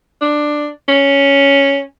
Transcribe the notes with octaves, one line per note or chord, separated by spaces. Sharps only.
D4
C#4